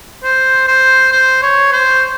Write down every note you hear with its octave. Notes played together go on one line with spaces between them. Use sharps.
C5
C5
C5
C#5
C5